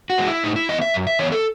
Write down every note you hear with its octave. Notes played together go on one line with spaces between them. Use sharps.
F#4
E3 G#3 B3
E4
A2 D#4
E4
E3 B3 D#5
E5
F#2
E5
E3 B3 C#5
A4